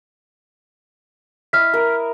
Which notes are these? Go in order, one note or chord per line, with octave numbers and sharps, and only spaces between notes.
E4 D#5 E5 F6 B6
A#4